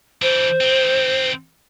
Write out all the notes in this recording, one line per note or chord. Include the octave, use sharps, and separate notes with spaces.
E3 D4 C5
D#3 C4